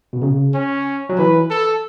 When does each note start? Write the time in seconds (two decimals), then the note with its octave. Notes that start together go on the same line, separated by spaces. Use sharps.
0.13 B2
0.22 C#3
0.54 C#4
1.09 F#3
1.18 E3 B4
1.50 A4